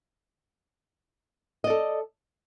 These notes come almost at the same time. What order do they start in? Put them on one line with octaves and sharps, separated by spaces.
D#5 D5 A4